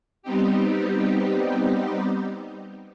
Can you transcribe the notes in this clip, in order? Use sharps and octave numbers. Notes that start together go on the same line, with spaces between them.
G3 B3 C4 D#4 G4